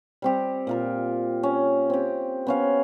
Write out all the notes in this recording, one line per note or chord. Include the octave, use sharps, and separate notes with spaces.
G3 C4 G4
A#2 F4 A#4
C#4
C4 G4
B3 C#4 F5